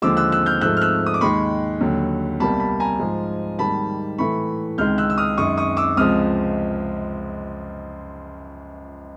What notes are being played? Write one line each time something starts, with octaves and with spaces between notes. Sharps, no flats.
D#2 D3 F3 G#3 D6 E6
E6 F#6
E6 F#6
F6 G6
G#2 F3 A3 E6 F#6
F6
E6 F#6
D#6
D6
D#2 D#3 G#3 B5 C#6
D#2 D3 F#3
C2 B2 G3 A#3 A5 B5
A5 B5
G#5 A#5
G#2 F3 G#3
G#2 D#3 G3 A#3 A5 B5
A2 E3 A3 B5 C#6
C#2 C3 D#3 G#3 F6 G6
E6 F#6
E6
D#6 F6
F#2 D#3 G#3 C#6 D#6
C#6 D#6
D6 E6
C#2 C3 F3 G#3 D#6 F6